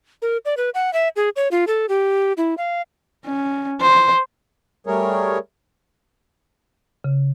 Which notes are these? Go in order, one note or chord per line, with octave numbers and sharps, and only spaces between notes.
A#4
D5
B4
F#5
E5
G#4
C#5
F4
A4
G4
E4
F5
C#4
C5
G3 A3 G#4 A#4 C#5
C#3